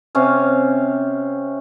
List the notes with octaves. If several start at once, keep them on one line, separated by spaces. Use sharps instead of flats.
C3 C#4 F5